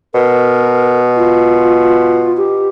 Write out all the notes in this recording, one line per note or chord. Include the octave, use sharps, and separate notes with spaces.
B2 A#4
F4
G4